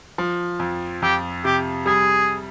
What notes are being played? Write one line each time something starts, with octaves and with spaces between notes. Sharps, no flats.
F3
F2
F2 G4
C3 G4
G3 G#4